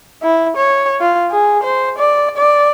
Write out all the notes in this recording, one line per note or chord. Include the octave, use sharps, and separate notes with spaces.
E4
C#5
F4
G#4
C5
D5
D5